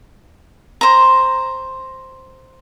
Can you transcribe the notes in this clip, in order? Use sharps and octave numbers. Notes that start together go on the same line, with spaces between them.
C5 A#5